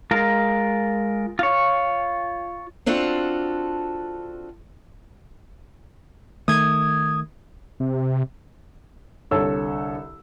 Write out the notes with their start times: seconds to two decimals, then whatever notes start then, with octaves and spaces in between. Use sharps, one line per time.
0.11 G#3 F4 A#4
1.39 F4 C#5
2.86 C4 D4 F4 F#4 A4 F#5
6.48 D#3 A3 D#6 G#6
7.80 C3
9.31 C2 D3 A4 C#5 E6